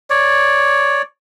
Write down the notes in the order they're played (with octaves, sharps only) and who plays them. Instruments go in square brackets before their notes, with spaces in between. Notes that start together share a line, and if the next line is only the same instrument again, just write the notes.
[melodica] C#5 D5